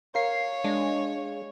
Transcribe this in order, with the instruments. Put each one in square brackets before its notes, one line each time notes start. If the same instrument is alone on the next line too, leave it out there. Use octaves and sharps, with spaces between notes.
[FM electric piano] A#4 C7 [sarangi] C#5 [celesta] F5
[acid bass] G#3 [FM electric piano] D4